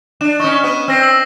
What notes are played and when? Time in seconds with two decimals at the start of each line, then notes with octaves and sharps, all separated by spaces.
0.21 D4 E7
0.40 C#4 D#4 C#6 E7
0.64 B3 B4
0.88 C4 F6 A#6 C7
1.03 F#7